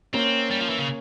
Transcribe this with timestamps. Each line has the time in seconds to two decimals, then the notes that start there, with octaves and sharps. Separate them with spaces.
0.13 A#3 C4 C#4
0.51 G3
0.60 F3
0.69 E3
0.79 C#3